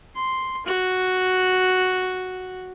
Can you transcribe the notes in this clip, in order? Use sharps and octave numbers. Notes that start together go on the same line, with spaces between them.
C6
F#4